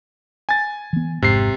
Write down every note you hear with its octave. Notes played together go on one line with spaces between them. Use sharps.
G#5 A6
E3 B3
G#1 F2 G#2 C3 C7